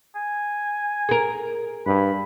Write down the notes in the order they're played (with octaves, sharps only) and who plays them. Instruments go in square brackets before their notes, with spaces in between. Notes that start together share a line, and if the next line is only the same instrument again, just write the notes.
[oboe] G#5
[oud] G#4 A#4
[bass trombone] G2 [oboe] B5